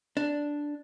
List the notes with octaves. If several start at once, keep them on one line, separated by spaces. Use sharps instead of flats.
D4